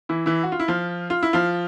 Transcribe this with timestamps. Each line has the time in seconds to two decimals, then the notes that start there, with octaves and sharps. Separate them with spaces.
0.09 E3 E4
0.26 E3 E4
0.43 F#4
0.52 F4
0.60 E4
0.68 F3 F4
1.10 F4
1.23 E4
1.33 F3 F4